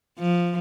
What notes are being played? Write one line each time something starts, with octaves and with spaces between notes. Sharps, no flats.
F3